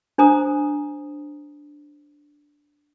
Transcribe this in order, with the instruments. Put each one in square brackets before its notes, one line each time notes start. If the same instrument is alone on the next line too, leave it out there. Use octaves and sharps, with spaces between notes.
[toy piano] D4 C5 A#5 D#6